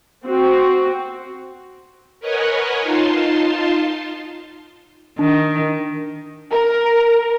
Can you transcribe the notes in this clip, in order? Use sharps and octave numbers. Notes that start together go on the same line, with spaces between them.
C4 F#4
A#4 B4 C#5 D#5 F#5 G#5
D#4 F4 A5 C6
D#3 D4
A#4